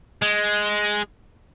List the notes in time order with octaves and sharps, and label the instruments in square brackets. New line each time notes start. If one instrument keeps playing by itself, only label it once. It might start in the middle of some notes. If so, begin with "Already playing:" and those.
[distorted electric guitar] G#3